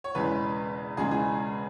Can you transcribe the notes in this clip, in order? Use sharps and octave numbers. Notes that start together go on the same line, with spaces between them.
C#5
E1 E2 C#3 G#3 B4
E1 E2 C#3 G#3 G#4
G#4